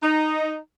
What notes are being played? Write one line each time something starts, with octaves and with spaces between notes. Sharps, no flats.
D#4